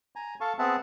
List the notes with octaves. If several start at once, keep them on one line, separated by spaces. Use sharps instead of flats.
G#5 A#5
A4 F5 A5 C#6
B3 C4 G#4 E5 F#5 A5